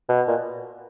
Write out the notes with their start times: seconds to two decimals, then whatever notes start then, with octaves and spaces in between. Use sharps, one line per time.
0.09 B2
0.28 A#2